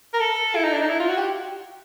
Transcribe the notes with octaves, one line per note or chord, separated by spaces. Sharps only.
A#4
A4
E4
D#4
D4
D#4
E4
F4
F#4
G4